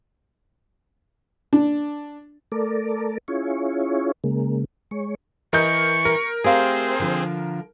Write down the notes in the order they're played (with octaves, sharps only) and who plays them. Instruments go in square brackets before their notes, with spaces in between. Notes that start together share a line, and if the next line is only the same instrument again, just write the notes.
[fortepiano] D4
[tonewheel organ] A3 A4 A#4 D5
C#4 E4 F4 G#4 C#5
C#3 G#3 A#3
G#3 C#5
[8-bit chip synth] E3 [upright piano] A#4 D#5 G6 [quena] C#6
[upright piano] A#4
[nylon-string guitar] A3 G4 F5 [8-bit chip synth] C4 G#4 [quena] C5
[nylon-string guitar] D3 F3